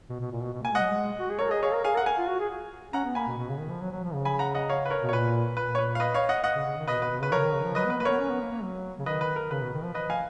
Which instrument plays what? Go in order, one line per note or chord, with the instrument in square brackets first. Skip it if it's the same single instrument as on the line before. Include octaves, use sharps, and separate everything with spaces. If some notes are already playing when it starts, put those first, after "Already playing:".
[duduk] B2
B2
A#2
B2
B2
[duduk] A#3 [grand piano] G#5
[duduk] G#3 [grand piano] D#5 F#5
[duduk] F#3
G#3
F#4
G#4
[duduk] A#4 [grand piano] C#5
[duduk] G#4 [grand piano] D#5
[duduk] G#4 [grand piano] C#5 F5
[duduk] A#4
[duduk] G#4 [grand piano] F5 G#5
[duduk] A#4 [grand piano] F#5
[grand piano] F5 G#5
[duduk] F4
F#4
G#4
[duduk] C#4 [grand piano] F#5 A#5
[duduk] B3
[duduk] A#3 [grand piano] G#5 B5
[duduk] B2
B2
C#3
D#3
F3
F#3
F#3
F3
C#3
[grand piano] G#5 B5
F#5 A#5
D#5 F#5
C#5 F5
B4
A#4 C#5
[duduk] B2
[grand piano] C#5
[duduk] A#2 [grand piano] B4
[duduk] A#2 [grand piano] B4
[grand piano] C#5
B4
F5
B4 D#5
C#5 F5
D#5 F#5
D#5 F#5
[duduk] C#3
C#3
D#3
[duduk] B2 [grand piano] B4 D#5
[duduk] B2
[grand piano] B4
[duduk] B2
[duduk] C#3 [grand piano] B4
[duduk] F3 [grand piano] A#4 C#5
[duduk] C#3
D#3
C#3
F3
[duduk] F#3 [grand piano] B4 D#5
[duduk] B3
[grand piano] B4
[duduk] A#3
[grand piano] B4
[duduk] B3 [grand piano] A#4 C#5
[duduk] C#4
B3
A#3
A#3
F#3
C#3
[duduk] D#3 [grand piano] B4 D#5
[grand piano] B4
A#4
[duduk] C#3 [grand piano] B4
[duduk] B2
D#3
F3
[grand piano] B4 D#5
F5 G#5